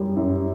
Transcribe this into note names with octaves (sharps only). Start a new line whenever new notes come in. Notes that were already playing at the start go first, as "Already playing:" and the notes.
Already playing: F#2 G3
F#2